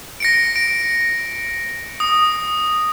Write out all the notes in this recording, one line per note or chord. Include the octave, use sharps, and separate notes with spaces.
A#6 C#7 D7
D7
D#6